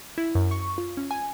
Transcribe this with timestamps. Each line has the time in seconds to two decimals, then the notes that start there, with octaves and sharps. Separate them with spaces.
0.18 E4
0.35 F#2
0.51 C#6
0.78 F4
0.97 C#4
1.11 G#5